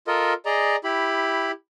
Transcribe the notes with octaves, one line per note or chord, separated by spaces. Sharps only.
F4 A4 A#4 D#5
G#4 D5 D#5 A#5
E4 G4 B5